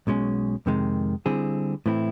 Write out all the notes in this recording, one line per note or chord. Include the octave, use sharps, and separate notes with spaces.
B1 B2 G#3 C#4
F2 C3 D#3 G#3
D3 G3 C4 E4 G#4
A2 E3 A3 C4 E4